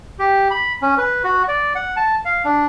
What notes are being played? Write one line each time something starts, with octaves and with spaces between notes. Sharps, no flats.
G4
B5
C#4
B4
F#4
D5
F#5
A5
F5
D4